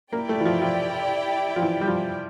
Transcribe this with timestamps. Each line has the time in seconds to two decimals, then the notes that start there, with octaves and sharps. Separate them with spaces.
0.12 A#3 E4 G4 D5 G5
0.29 A3
0.41 E3
0.45 F3
0.62 F3
1.56 F3
1.62 E3
1.81 G3
1.88 F3